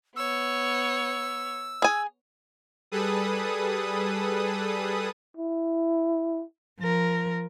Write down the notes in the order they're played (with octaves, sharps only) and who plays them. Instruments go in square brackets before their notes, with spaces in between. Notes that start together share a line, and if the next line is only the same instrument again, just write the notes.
[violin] B3 C#5 [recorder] E6
[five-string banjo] G#4 G#5
[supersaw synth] G3 G#4 A4 B4 D#6
[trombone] E4
[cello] F3 A#4